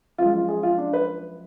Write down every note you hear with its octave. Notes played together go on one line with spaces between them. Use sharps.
F#2 F3 G#3 F4
F4
G#4
F4
D4
B4